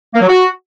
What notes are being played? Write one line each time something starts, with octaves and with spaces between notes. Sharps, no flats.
A#3
F#3
F#4